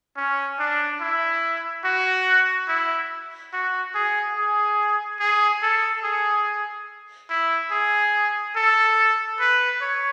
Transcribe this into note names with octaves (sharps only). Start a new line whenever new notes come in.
C#4
D4
E4
F#4
E4
F#4
G#4
G#4
G#4
A4
G#4
E4
G#4
A4
B4
C#5